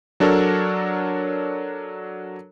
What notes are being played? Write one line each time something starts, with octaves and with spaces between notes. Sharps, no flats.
F#3 D4 F#4 A4 A#4 C#5